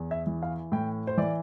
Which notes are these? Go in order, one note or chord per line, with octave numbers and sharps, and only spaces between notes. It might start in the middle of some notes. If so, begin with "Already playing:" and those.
Already playing: E2
E5
E3
F5
A2 G5
C5
E3 D5